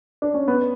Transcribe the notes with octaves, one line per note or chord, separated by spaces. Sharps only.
D4
C#4
B3